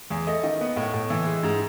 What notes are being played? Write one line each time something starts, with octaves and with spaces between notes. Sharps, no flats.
E2 G#4
A3 D#5
D#3 D#5
B3
A2
A2
E3
G#3
G#2